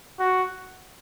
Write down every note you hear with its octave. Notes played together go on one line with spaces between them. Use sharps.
F#4